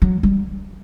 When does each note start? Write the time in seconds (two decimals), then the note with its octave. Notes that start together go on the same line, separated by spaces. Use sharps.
0.02 F#3
0.23 G3